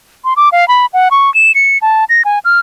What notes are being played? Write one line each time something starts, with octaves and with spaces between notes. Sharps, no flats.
C6
D6
F5
B5
F#5
C#6
E7
C#7
A5
A#6
G#5
F6